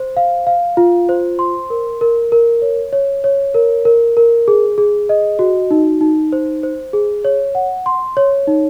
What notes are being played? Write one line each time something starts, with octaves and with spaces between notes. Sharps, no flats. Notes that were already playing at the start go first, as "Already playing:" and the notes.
Already playing: C5
F5
F5
F4
C5
C6
A#4
A#4
A#4
C#5
C#5
C#5
A#4
A#4
A#4
G#4
G#4
D#5
F#4
D#4
D#4
C5
C5
G#4
C#5
F#5
C6
C#5
D#4